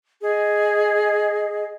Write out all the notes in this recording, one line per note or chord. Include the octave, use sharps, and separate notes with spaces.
G#4 D#5